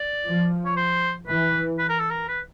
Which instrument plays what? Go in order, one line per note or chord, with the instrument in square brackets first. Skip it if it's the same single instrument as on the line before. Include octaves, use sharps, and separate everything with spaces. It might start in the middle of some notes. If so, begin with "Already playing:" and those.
Already playing: [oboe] D5
[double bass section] F3
[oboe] C#5
C5
[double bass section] E3 [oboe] B4
[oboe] B4
A#4
A4
A#4
B4